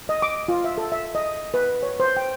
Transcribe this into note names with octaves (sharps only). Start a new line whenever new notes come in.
D#5
D6
F4
E5
A4
E5
D#5
B4
C#5
C5
G5